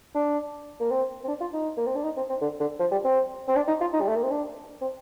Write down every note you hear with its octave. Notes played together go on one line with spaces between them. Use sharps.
D4
A#3
C4
C4
D4
F4
D#4
A#3
C4
D4
D#4
C4
C4
D3
D3
F3
G3
C4
C4
D4
D#4
F4
D#4
G3
A3
A#3
C4
D4
C4